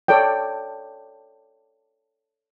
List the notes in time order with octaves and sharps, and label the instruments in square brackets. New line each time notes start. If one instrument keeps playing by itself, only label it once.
[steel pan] A4 C#5 D5 G5